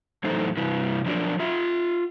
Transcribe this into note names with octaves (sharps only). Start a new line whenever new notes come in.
E2 A2 F#3 D#4 A4 C5
G2 C3 E4 B4
F3 F#3 D4 A#4 D5
F4 E5